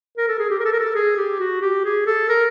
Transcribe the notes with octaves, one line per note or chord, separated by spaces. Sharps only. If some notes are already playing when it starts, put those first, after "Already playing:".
A#4
A4
G#4
G4
A#4
A4
A#4
A4
G#4
G4
F#4
G4
G#4
A4
A#4